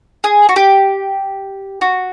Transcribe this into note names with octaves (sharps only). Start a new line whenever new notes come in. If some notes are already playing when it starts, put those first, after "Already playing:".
G#4
F#4
G4
F#4